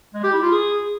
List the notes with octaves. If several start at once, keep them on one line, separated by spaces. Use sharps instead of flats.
G#3
G4
E4
F4
G#4